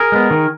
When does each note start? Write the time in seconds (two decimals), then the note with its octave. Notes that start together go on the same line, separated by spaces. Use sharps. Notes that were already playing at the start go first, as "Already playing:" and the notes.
Already playing: G#4 A#4
0.12 G#3 B3
0.31 D#3